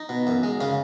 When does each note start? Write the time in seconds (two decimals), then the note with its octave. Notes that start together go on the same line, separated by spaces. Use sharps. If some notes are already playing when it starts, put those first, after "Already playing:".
Already playing: D#4
0.09 B2
0.27 F#2
0.43 G#3
0.61 C#3 C#4